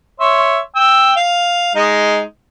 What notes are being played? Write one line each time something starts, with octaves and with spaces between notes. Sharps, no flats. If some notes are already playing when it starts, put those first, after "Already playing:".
C#5 E5 C6
G5 E6
F5
G#3 D#4